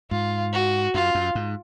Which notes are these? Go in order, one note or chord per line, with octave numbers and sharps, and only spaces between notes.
G#2 F4
F#4
F#2 F4
F#2
G#2